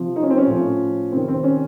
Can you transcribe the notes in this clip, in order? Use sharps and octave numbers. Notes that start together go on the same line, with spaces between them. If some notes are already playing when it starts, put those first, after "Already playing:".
Already playing: C3 F3
D#4
C#4
C4
C#4
A2 F3
C3 D#3 C4
C4
C#4